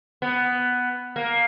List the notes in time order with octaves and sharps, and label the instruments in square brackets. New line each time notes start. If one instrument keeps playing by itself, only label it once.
[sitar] B3
A#3